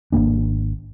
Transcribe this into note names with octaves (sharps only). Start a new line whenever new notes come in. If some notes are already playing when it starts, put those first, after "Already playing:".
G#1 G#2 A#3 D4